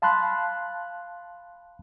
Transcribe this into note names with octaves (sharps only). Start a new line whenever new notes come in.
F5 A5 B5 C6 F#6